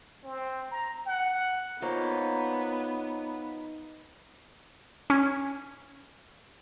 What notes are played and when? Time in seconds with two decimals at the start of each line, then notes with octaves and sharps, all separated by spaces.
0.24 C4
0.71 A#5
1.06 F#5
1.82 A#3 B3 D#4 F4 C5 C#5
5.10 C#4